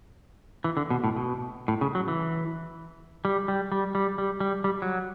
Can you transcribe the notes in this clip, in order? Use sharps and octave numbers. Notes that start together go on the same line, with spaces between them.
E3
D3
B2
A2
B2
A2
C#3
F#3
E3
G3
G3
G3
G3
G3
G3
G3
F#3